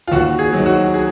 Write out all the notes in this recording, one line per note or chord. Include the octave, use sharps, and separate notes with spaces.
F4
D#2 F#4
G#4
D#3 F#3
F#4
G#4